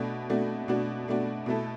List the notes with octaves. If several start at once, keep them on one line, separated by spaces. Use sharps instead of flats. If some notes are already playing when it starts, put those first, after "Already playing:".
Already playing: B2 A3 D4 F#4
B2 A3 D4 F#4
B2 A3 D4 F#4
B2 A3 D4 F#4
B2 A3 E4 A4